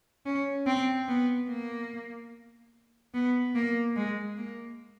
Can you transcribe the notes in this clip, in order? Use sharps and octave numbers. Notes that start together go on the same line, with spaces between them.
C#4
C4
B3
A#3
B3
A#3
G#3
A#3